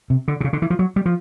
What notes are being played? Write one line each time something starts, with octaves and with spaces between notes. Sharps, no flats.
C3
D3
C3
C#3
D3
E3
F3
F#3
G3
F3